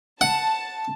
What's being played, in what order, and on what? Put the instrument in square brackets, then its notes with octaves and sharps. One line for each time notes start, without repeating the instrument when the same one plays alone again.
[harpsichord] F#5 [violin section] A5